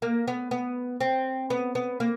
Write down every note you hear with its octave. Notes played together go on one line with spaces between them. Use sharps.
A#3
B3
B3
C4
B3
B3
A#3